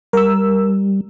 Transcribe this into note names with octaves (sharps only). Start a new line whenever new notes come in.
G3 A#4 E6